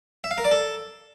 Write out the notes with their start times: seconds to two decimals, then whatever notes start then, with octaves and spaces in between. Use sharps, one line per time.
0.24 E5
0.31 F5
0.38 A#4
0.45 D5
0.51 A4